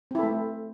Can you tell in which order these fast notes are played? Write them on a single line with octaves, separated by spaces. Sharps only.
C4 E4 A4 A3